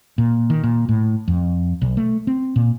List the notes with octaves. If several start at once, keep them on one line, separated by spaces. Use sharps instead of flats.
A#2
D#3
A#2
A2
F2
B1
A3
C4
A#2